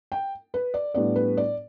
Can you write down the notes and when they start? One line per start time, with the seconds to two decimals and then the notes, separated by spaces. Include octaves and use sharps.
0.12 G5
0.54 B4
0.74 D5
0.94 A2 G3 B3 D4 D5
1.16 B4
1.37 D5